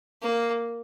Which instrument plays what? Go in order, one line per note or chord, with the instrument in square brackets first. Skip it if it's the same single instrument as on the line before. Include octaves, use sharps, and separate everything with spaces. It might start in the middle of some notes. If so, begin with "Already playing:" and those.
[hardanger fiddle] A#3